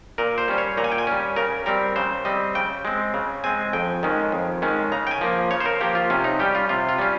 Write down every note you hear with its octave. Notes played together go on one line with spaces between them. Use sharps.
A#2 A#4
C5
G3 C#4
C#5
A#2 A#5
G#5
G5
G#5
G3 C#4
C#3 A#4
G3 C4 A#4
C#3 C5
G3 C4 D#5
C#3 G5
G#3 C4
C#3
G#3 C4 G#5
F2 G5
D#3 G#3 C#4
F2
D#3 G#3 C#4
C#3 A#5
G5
G#5
F3 A#3
C#3 C#5
C5
A#4
F3 A#3 G4
F4
C3 C#4
D#4
G3 C#4 G4
F4
C3 F4
F4
G3 C#4